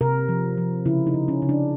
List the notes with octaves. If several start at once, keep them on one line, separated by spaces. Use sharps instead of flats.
C3 A#4
F3
F3
C#3 E4
D#4
C#3
C#4
C#3
D4